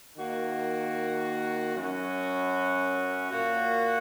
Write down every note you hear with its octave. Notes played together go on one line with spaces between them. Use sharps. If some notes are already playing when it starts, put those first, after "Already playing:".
D#3 A#3 F#4
F#2 F#3 C#4 F#4
A#2 A#3 F#4